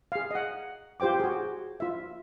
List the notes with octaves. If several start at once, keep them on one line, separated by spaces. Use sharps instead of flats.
G#4 F5
D#5 F#5
F4 G4 C5 G5 D6
F#4 G#4
F4 E5